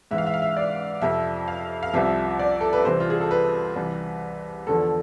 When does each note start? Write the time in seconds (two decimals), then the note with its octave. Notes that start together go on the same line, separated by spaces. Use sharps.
0.11 G#2 E3 E5
0.18 F5
0.27 E5
0.34 F5
0.42 E5
0.57 D5
1.02 F2 C3 F3 E5
1.48 F5
1.83 F5
1.93 C2 C3 F3 E5
2.39 D5
2.61 A4
2.73 B4
2.85 C2 C3 E3 C5
3.00 F4
3.10 G#4
3.20 A4
3.31 B4
3.76 C2 C3 E3
4.67 E2 D3 F3 A4